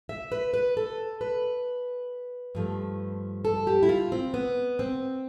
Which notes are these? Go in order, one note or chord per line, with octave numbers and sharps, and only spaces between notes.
E5
B4
B4
A4
B4
G2 F3 A3
A4
G4
E4
F4
C4
B3
C4